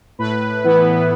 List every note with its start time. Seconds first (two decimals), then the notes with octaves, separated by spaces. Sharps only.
0.19 A2 B4
0.64 E3 B3 E4